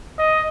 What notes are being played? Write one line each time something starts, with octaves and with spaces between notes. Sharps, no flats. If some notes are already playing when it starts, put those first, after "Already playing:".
D#5